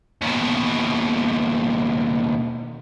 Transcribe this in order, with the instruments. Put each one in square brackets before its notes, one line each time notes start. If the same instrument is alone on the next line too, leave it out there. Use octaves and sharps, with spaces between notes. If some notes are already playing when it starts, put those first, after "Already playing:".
[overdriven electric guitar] D#2 B2